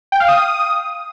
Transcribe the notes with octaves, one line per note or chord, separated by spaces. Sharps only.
G5
F5
D#6